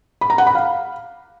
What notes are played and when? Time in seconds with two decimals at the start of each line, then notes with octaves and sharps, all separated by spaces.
0.21 B5
0.30 A#5
0.38 F#5
0.47 B5
0.55 F5